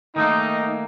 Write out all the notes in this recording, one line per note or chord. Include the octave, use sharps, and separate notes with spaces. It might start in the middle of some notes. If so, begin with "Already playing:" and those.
D#3 A3 A#3 D#4